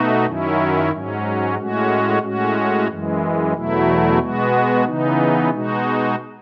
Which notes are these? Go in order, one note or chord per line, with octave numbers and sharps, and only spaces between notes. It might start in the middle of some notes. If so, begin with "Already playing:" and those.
Already playing: B2 A3 D#4 F#4
F#2 D#3 F#3 C#4 E4
G#2 F#3 C#4
A2 G#3 C#4 F#4
A2 G#3 C#4 F#4
F#2 E3 G#3
E2 B2 F#3 A3 E4
B2 G#3 B3 F#4
C#3 E3 B3 D#4
B2 G#3 D#4 F#4